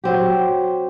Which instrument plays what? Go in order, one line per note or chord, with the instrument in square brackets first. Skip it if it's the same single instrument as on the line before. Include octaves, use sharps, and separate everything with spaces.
[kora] F#3 C4 G4